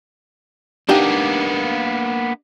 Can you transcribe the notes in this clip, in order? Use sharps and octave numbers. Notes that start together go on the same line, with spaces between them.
A#3 B3 D4 D#4 G4